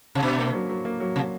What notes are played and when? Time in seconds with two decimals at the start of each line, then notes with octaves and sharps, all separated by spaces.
0.15 C3
0.22 B2 D4
0.39 A#3
0.54 F#3
0.69 F#3
0.85 A#3
1.00 F#3
1.16 C3